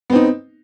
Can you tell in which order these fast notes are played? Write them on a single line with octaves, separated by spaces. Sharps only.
B3 C4 D#4